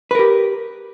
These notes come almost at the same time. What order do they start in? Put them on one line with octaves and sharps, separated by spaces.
B4 A#4 G4